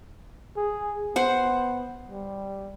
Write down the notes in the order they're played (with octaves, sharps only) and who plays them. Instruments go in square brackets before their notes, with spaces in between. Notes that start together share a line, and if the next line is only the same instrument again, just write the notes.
[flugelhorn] G#4
[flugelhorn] B3 [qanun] C5 F#5
[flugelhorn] G3